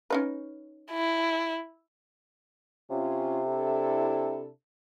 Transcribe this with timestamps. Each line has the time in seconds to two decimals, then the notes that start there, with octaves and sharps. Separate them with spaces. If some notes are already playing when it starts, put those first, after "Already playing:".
0.10 C#4 D#4 B4
0.91 E4
2.90 C3 C#4 F4
3.46 D4 E4 A4